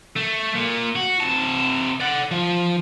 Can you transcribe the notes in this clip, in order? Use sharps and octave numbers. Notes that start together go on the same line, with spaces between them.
A3
A#2
F#4
C3 A5
D5 F#5
F3